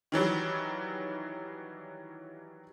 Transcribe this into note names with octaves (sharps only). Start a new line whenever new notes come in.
D#3 E3 F#3 G3